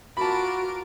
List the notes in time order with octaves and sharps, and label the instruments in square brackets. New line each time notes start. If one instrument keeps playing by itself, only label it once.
[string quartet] F4 A#4 D6 [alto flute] F#4 [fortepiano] A5 B5